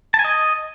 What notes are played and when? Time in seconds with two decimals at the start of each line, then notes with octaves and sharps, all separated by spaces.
0.14 A5
0.19 G#5
0.24 D#5